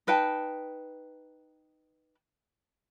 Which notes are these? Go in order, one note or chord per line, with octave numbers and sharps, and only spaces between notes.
D#4 B4 G5 A5